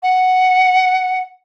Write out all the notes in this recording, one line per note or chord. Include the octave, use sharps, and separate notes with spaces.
F#5